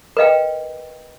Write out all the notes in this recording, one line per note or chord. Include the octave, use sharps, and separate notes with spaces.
A#4 B4 D#5 F5 G5